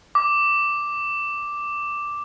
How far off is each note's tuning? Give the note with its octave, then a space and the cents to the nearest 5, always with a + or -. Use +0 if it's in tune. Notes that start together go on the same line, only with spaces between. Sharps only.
D6 +0